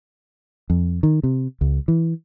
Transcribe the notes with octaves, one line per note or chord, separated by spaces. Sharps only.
F2
D#3
C3
C#2
E3